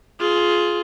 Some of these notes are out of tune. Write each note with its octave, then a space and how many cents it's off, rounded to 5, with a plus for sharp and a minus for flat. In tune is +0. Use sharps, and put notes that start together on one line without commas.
F4 +0 G#4 +20